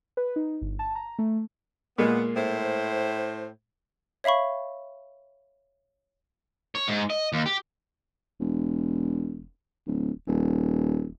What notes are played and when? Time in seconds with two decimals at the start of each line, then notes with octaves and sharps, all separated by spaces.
0.17 B4
0.36 D#4
0.62 G1
0.79 A5
0.95 A#5
1.19 A3
1.98 A#2 G#3 A#3 B3
2.36 A2 C5
4.24 C#5 E5 F5 B5 C#6
6.75 C#5
6.88 G#2
7.10 D#5
7.33 D#2
7.46 G4
8.40 E1
9.87 D1
10.27 D#1